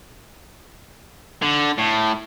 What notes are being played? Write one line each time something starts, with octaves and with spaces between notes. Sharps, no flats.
D3
A2